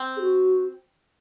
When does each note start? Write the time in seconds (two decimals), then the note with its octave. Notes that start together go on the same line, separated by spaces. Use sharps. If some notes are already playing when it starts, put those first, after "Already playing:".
Already playing: C4
0.17 G#4
0.21 F#4